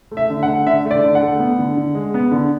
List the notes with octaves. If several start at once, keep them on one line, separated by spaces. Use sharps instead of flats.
A3
E5
D3
A3 F#5
D3 E5
A3
D5
D3
F#5
A3
B3
D3
D3
G#3
B3
D3